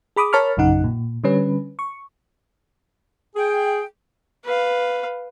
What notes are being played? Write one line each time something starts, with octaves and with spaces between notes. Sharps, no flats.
G#4 B5 D6 D#6
A#4 C#5 A5 B5 C#6 F6
A#1 F#2 C#3 D#4 F#5
A#2
D3 G3 C#4 B4
C#6
G#4 G5
B4 F5